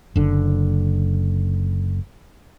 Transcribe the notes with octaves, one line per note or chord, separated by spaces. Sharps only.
F#1 D3